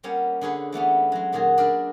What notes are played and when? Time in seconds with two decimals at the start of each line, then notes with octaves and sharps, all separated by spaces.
0.03 G3 A#3 B3 C#4 C#5
0.41 D3 G#4 B4 C#5
0.73 E3 A3 B3 C#4
1.12 F#3 G#3
1.33 A#2 D#3 F#3 F#4 G#4
1.58 D4 A#4 B4 D5